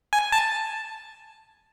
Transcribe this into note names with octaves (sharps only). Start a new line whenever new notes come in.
G#5
A5